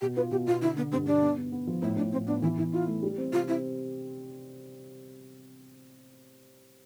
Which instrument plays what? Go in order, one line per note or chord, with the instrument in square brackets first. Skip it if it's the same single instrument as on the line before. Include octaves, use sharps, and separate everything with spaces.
[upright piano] B2 [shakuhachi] G4
[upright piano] F4 [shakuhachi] B4
[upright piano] B2 [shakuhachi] G4
[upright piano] B2 [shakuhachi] F4
[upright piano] D3 [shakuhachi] E4
[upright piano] D3 [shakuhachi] B3
[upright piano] G2 [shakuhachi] C4
[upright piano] G2 [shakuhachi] D4
[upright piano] B3
B3
B3
F3
[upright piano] A2 [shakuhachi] E4
[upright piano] A2 [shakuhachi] D4
[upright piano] A2 [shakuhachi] C4
[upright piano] B3 [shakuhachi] D4
[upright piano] E3 [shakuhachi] E4
[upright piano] E3 [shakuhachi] E4
[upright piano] E4 [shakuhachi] F4
[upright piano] A3
G3
C4
[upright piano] C3 [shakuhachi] F4
[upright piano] C4 [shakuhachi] E4